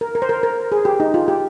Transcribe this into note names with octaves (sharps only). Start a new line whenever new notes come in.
A#4
A#4
C5
A#4
A#4
G#4
G4
D#4
F4
G4